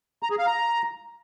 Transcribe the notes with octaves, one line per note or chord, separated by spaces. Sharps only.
A#5
G#4
F5
A#5